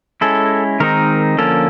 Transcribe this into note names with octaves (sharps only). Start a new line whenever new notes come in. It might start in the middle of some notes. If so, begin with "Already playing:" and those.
G#3 C#4 E4 A4
D#3 G#3 C4 D#4 A#4
D3 F3 A#3 C#4 A4